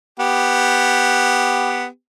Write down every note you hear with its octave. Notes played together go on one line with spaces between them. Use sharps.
B3 G4